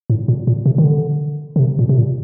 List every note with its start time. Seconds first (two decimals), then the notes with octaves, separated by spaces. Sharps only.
0.10 A2
0.28 A#2
0.47 A#2
0.66 C3
0.78 D#3
0.84 D3
1.56 D3
1.59 C3
1.79 A#2
1.89 C3
1.98 A#2